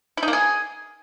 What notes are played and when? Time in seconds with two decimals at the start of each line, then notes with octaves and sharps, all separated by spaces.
0.17 E4
0.23 D#4
0.28 A#3
0.33 G#4